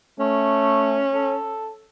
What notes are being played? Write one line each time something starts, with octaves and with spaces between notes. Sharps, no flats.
A3 C#4
A4